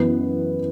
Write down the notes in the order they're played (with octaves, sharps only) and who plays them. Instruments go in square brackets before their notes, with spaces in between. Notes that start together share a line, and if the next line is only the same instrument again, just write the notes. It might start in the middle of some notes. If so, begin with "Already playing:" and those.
Already playing: [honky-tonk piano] F#2 E3 B3 E4